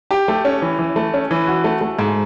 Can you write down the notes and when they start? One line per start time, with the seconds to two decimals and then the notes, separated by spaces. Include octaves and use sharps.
0.11 G4
0.28 A3
0.45 C#4
0.62 E3
0.79 E3
0.96 A3
1.14 C#4
1.31 E3
1.47 F#4
1.64 A3
1.81 A3
1.99 G#2